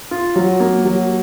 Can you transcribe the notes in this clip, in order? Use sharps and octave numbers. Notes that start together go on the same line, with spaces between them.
F4
F#3
A#3
F#3